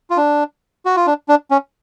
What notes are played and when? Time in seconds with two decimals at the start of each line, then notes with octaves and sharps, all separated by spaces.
0.10 F4
0.17 D4
0.86 F#4
0.96 F4
1.07 D4
1.28 D4
1.51 C#4